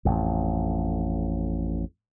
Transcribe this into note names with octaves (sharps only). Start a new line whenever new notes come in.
A1 F2